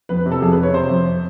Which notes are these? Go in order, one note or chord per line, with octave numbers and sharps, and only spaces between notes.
F2 B4
C3
A4
F2 G#4
B4
C3
C#5
C3 C5
F2